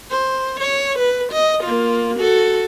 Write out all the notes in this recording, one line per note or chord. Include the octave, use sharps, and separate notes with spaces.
C5
C#5
B4
D#5
A#3 F4
F#4 A4